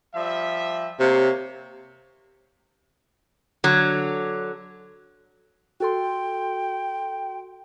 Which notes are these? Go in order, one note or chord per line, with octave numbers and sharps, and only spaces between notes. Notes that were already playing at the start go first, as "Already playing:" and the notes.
F3 G3 E5
C3 A#3 C#5
D3 F#3
F#4 A4 G5 C6